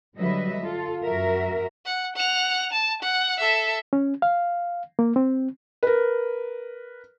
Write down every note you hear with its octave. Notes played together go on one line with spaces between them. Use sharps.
D3 F#3 G3 B4 D#5 E5
F4 A4
F#2 F#4 A#4 E5
F#5
F#5 F7
A5
F#5
A4 E5
C#4
F5
A#3
C4
A#4 B4